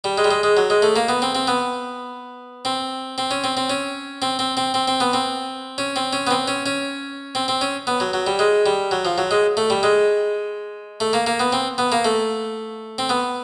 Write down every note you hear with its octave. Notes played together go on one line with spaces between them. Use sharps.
G3
G#3
G3
G#3
G#3
F#3
G#3
A3
A#3
B3
C4
C4
B3
C4
C4
C#4
C4
C4
C#4
C4
C4
C4
C4
C4
B3
C4
C#4
C4
C#4
B3
C4
C#4
C#4
C4
C4
C#4
B3
F#3
F#3
G3
G#3
G3
F#3
F3
F#3
G#3
A3
G3
G#3
A3
A#3
A#3
B3
C4
B3
A#3
A3
C4
B3